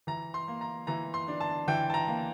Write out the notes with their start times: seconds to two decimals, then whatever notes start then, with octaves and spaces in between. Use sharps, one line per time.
0.07 E3 A#5
0.34 C6
0.48 A#3
0.61 A#5
0.87 E3 A#5
1.14 C6
1.28 D4
1.40 A5
1.68 E3 G5
1.90 A5
1.94 A#5
2.08 A#3